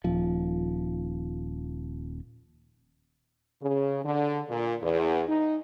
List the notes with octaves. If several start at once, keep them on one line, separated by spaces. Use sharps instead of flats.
D#1 F3
C#3
D3
A#2
E2
D#4